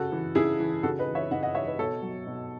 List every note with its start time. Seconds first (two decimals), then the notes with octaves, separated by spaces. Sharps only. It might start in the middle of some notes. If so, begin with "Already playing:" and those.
Already playing: C#3 F#4 A4
0.12 E3
0.35 C#3 E4 G#4
0.59 E3
0.83 C#3 F#4 A4
0.99 B4 D#5
1.07 E3
1.15 C#5 E5
1.31 C#3 D#5 F#5
1.43 D#5 F#5
1.55 E3 C#5 E5
1.66 B4 D#5
1.79 B2 A4 C#5
2.02 F#3
2.27 B2